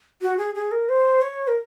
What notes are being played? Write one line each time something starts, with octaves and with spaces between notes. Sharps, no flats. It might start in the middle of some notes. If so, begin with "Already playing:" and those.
F#4
G#4
G#4
A#4
C5
C#5
A#4